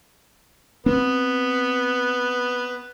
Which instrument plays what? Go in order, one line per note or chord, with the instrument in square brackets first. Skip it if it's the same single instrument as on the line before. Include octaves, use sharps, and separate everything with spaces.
[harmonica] B3 [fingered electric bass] C4